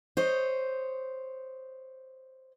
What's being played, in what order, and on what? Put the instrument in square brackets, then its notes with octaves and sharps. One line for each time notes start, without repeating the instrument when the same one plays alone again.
[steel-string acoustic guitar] C5 C#5 D#5